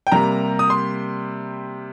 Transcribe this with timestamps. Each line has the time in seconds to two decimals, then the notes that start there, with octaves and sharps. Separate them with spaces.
0.07 G5
0.12 C3 G3 A#3 A#5
0.59 D#6
0.70 C6